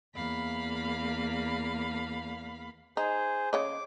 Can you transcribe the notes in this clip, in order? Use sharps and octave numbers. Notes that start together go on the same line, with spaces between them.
E2 A#3 F5 B5
D#4 G#4 C5
C#3 C#5 D#5 D6